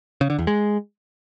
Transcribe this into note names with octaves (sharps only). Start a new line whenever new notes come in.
C#3
D3
E2
G#3